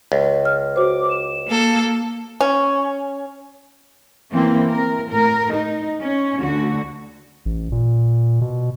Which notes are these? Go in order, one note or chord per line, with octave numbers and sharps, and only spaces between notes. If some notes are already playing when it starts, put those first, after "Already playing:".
C#2
F6
F#4 C5 D6
E7
A#3 A4
C#4
E3 A#3 C4
A#4
A2 A#4
D#4
C#4
D2 D3 F#4
A1
A#2
B2